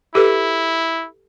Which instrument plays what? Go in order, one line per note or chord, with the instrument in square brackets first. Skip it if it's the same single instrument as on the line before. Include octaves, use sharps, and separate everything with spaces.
[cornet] E4 [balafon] G4 A4 B4